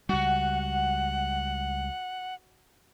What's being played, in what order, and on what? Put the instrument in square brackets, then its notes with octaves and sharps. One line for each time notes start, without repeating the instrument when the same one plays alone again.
[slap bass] C#2 G3 [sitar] F#4 [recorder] F#5